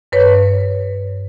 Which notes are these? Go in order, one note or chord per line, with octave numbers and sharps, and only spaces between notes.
G2 B4 C#5